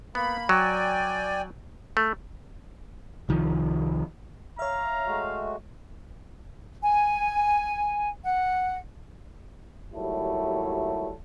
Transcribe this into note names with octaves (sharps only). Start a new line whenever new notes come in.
A#3 B3 B5
F#3 D5 G5 G#5
A3 F6
C2 D#3 F3
C#5 E5 F5 A#5
G#3 A3 F#4
G#5
F#5
D#2 F#3 G3 A3 E4